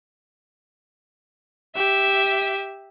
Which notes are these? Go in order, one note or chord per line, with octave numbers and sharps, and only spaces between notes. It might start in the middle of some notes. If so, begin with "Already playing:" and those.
G4 E5